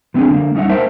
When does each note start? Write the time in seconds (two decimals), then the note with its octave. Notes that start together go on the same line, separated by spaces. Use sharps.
0.14 F3 B3 C4 D4 G#4
0.29 D3 G#3 A#3
0.55 G3 C#4 D#4 G#4 E5 F#5
0.69 A#3 A#4 C5 E5 G5 A5